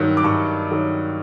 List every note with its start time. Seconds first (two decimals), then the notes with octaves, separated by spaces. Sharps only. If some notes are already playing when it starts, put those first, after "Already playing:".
Already playing: G2 D#3 F#3
0.17 D6
0.24 G2 C#6
0.71 D#3 F#3